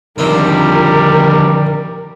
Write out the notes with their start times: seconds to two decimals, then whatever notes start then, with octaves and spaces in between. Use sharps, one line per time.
0.18 D3 D#3 F3 G3 C4 A#4